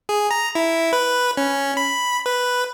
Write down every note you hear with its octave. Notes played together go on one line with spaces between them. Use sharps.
G#4
A#5
E4
B4
C#4
B5
B4